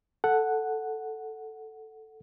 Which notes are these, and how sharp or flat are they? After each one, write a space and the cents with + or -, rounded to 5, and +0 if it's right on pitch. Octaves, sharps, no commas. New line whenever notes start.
A4 +0 F#5 +0